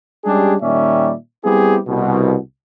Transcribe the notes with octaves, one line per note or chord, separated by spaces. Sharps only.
G3 G#3 C#4 D4 G4 G#4
A#2 D#3 G3 C#4 D5 E5
G3 B3 C4 E4 G4 G#4
C2 B2